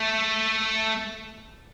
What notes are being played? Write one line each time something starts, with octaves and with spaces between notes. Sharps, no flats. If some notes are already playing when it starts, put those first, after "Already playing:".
Already playing: A3